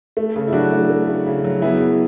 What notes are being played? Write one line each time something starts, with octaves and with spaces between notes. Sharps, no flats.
A3
C#3
E4
F#3 D4 F#4
A3
A3
C#3
C#3
F#3
B3 E4 G#4
B3